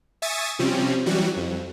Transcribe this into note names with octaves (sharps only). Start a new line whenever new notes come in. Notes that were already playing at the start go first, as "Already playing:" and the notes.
E5 G#5 C#6 D#6 A6
C3 F3 G3 C4 C#4
E3 F#3 G3 F#4
F2